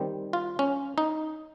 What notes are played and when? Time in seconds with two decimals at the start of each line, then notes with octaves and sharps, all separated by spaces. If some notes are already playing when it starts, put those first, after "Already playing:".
Already playing: D#3 G3 C4
0.33 F4
0.59 C#4
0.98 D#4